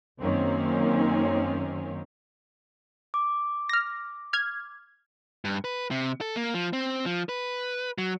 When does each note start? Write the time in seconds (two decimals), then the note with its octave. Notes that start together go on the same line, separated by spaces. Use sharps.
0.18 F#2 D#3 A#3 C4 C#4
3.14 D6
3.69 F6 A#6
4.33 F6 G#6
5.45 G2
5.64 B4
5.91 C3
6.21 A4
6.36 A#3
6.54 F3
6.73 C4
7.06 F3
7.29 B4
7.98 F#3